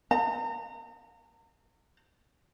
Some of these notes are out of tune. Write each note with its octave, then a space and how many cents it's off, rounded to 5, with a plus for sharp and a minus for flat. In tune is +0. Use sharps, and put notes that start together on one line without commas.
A#5 -35